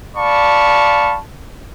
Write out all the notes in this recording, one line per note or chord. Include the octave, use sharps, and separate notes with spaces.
D5 F5 A5 B5 C#6